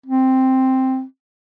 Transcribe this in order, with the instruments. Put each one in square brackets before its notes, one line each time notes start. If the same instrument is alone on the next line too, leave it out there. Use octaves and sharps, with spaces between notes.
[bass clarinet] C4